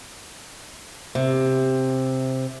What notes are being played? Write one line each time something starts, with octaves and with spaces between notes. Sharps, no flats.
C3